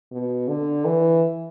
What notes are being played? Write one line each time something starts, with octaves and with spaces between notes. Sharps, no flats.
B2
D3
E3